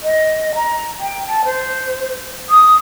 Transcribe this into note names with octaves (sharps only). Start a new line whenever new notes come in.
D#5
A#5
G5
A5
C5
D#6